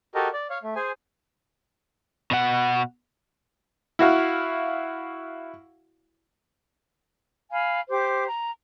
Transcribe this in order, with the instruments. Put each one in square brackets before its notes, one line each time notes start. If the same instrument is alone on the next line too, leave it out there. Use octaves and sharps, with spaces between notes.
[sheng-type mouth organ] F#4 G4 A4 A#4 D#5
D5
C#5 F5
A3
G#4 C5 G#5
[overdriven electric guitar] B2 F#5
[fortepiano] E4 F#4 F5
[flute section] F5 G#5 B5
G4 C5 D6
A#5